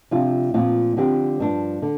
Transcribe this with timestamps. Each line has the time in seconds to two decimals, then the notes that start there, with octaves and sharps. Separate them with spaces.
0.11 C3 F3 D4 F4
0.54 A#2 F3 C4 F4
0.97 D3 F3 C4 G4
1.39 G2 F3 D4
1.82 D3